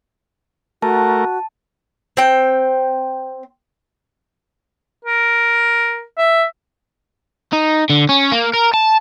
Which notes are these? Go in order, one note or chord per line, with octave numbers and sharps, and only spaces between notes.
A3 F#4 A#4 A5
C4 G5
A#4
E5
D#4
D3
C#4
A#3
A#4
A5